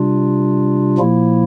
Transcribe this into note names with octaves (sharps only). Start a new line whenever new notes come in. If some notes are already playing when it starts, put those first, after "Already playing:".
Already playing: C3 G3 D4 F4
A#2 F3 A#3 E4